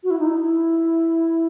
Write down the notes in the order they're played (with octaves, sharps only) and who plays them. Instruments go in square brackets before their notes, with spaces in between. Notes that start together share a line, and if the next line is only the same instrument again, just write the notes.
[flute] F#4
E4
D#4
E4